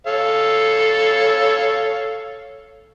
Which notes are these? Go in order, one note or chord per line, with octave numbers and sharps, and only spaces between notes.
A4 C#5 F5